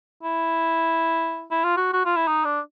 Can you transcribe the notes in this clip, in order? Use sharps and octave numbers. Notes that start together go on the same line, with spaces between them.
E4
E4
F4
F#4
F#4
F4
E4
D#4
D4